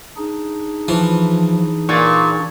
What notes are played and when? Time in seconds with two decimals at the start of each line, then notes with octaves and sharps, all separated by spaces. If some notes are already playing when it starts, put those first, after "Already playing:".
0.17 D4 D#4 G#4
0.88 E3 F3
1.89 A#2 C#6 G#6 A6